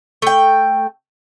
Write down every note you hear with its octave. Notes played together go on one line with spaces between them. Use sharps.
A3 G5